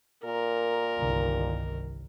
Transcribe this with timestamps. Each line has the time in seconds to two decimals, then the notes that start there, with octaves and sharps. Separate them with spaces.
0.25 A#2 A#4
0.97 G1 C2 D#3